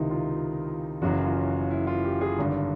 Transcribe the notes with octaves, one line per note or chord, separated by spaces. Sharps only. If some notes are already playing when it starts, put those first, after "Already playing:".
Already playing: C#2 C3 D#3 D#4 E4
F4
F#1 F#2 C#3 E3 F#4
F4
E4
F4
G4
G#4
G#1 G2 D3